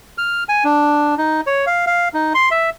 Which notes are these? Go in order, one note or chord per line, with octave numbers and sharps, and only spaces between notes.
F6
G#5
D4
D#4
C#5
F5
F5
D#4
C6
E5